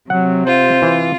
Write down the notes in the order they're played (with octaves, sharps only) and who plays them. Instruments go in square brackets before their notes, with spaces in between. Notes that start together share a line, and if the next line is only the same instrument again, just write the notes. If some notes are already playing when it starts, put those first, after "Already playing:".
[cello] C3 [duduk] F#3 [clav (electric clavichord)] F#5
[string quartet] F4 [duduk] C5
[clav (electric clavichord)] E3